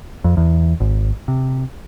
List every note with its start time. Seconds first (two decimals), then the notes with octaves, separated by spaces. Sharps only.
0.24 F2
0.37 E2
0.80 G#1
1.28 C3